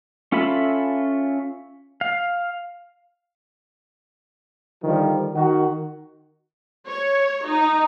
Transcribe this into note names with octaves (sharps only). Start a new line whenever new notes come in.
C#4 F4 A4 E5 B5
F5
D3 D#3 F3 G3
D#3 F#4
C#5
D#4